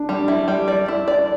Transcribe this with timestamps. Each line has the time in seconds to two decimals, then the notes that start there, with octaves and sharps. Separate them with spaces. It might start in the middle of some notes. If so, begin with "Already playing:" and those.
Already playing: D4
0.09 G3
0.28 E4
0.48 G3
0.68 D5
0.88 E4
1.08 D5